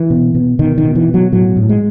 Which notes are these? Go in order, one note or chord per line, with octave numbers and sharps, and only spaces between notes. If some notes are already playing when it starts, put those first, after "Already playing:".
Already playing: E3
B2
B2
B2 D#3
D#3
B2
E3
B2
F#3
A2 F#3
A2
G#3